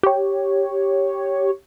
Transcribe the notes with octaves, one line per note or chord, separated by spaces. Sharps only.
G4 C#5